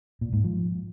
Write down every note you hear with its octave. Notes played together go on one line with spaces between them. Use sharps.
A#2
G#2
F3